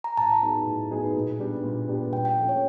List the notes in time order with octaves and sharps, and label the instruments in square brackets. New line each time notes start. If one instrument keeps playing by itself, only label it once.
[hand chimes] A#5
[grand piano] A2 [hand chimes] A5
[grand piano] F#3 B3 D#4 G#4
A2
F#3 B3 D#4 G#4
A#2
G3 B3 D4 G4
A#2
G3 B3 D4 G4
[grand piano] A#2 [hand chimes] G5
[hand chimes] G5
[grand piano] F3 A3 C#4
[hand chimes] C#5